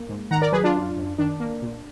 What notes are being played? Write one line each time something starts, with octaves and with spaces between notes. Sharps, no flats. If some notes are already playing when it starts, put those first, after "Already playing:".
Already playing: A#3
G#2
D#3 F#5 A#5
A#4 D5
F#3 G#4 B4
D4 F4
F#2
F#2
D#3 D4
A#3
A#2